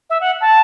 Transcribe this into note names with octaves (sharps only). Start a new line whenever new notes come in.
E5
F#5
A5